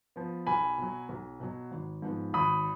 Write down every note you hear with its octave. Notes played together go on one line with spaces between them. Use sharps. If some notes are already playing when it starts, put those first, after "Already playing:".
F3 B3
B1 G#5 B5
B2 F#3
B1
B2 F#3
G#1
G#2 F3 B3
G#1 B5 D#6